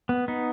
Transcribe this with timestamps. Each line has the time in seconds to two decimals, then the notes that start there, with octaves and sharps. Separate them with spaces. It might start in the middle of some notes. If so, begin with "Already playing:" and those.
0.09 B3
0.28 B3 D#4